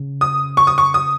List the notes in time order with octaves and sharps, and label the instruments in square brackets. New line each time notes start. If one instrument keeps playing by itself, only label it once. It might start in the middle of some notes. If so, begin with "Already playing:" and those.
Already playing: [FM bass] C#3
[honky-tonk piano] D#6
C#6
D#6
C#6
D#6